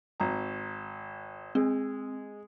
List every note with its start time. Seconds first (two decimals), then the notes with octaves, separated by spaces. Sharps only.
0.20 G#1 A#5
1.55 G#3 C4